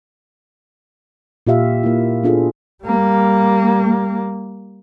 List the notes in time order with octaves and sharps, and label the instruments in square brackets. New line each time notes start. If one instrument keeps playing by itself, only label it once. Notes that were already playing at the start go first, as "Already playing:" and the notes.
[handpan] A#2 F4 G4 E5 F5
A#3 E4
B3 D4 F4 G#4 A4
[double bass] G3 A#3